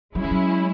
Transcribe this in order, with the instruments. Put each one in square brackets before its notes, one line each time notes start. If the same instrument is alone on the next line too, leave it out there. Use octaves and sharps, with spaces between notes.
[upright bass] F#3 [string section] G#3 C#4 E4
[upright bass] E3
F#3